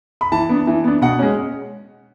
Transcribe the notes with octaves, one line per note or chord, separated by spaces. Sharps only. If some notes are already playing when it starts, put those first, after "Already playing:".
B5
E3 A5
B3 D4
E3
B3 D4
B2 F#5
G#3 C#4